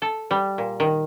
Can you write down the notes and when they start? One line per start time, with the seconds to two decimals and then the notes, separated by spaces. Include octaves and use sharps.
0.02 A4
0.31 G3
0.58 A#2
0.80 D#3